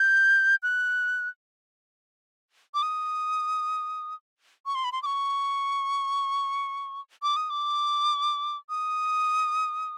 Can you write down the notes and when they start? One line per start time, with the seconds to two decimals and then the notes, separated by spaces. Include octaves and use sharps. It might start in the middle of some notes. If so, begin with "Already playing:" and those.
Already playing: G6
0.63 F#6
2.74 D6
2.83 D#6
4.66 C#6
4.75 C6
4.84 B5
4.92 C6
5.03 D6
5.06 C#6
7.23 D6
7.36 D#6
7.50 D6
8.69 D#6